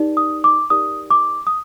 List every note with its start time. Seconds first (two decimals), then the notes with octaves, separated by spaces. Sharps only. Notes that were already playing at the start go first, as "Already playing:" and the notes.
Already playing: D#4 G4 A#4 D5
0.17 D#6
0.44 D6
0.70 D#4 G4 A#4 D5 D#6
1.11 D6
1.47 D#6